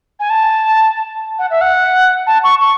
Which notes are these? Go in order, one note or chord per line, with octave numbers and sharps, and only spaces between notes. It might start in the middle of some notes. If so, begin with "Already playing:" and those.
G#5
A5
F#5
E5
F#5
A5
C#6
C#6